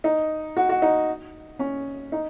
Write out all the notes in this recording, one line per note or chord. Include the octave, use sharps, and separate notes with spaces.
D#4
F#4
F#4
D#4
C#4
D#4